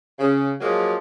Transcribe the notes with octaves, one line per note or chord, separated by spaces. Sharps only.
C#3
F3 F#3 G#3 A#3